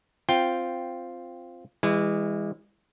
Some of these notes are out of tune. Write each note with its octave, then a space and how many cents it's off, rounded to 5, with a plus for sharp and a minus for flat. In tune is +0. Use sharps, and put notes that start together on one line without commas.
C4 +0 F4 +0 G5 +0
E3 +0 G#3 -35